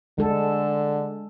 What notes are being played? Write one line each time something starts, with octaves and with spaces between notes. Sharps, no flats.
D3 G#3 A4